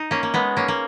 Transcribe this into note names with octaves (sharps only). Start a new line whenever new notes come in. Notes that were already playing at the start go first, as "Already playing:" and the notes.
Already playing: D#4
A#3 C#4
A#3
G#3 B3
A#3 C#4
A#3